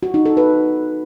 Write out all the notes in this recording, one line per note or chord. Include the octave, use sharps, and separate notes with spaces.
F#4
D#4
A4
B4